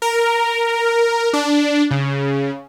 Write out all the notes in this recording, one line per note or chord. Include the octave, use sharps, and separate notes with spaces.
A#4
D4
C#3